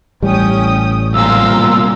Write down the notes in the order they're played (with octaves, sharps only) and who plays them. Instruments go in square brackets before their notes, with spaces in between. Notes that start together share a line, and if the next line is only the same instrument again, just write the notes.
[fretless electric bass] A1 G3 [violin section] C#4 G5 D#6
[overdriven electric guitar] C2 A#2 [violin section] F5 A#5 C6 [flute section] E6